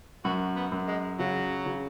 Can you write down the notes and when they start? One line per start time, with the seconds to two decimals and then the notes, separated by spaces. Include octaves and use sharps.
0.24 F#2 F#4
0.56 B3
0.72 F#2
0.88 G#3
1.19 C#3 F#3
1.66 C#3